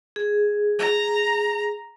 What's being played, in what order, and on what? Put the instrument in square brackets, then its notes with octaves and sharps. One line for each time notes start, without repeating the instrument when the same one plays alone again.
[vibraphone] G#4
[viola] A#5